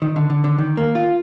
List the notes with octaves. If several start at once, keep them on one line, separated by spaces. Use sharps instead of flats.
D#3
D3
D3
D3
D#3
A#3
F4